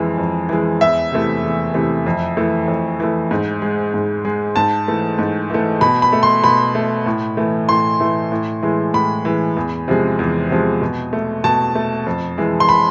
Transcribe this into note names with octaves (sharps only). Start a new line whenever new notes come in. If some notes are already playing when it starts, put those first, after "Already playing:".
Already playing: F2 E3 G#3
F2
E3 G#3
E2 E5
C3 E3 A3
E2
C3 E3 A3
F2
E3 A3
F2
E3 A3
G#2
G#3
G#2
G#3
G#2 A5
E3 A3
G#2
E3 A3
B2 B5
B5
A3
C6
B2 B5
A3
A2
E3 A3
A2 C6
E3 A3
A2
E3 G#3
A2 B5
E3 G#3
E2
C3 F3 G#3
E2
C3 F3 G#3
B2
A3
B2 A5
A3
F2
E3 G#3
C6
B5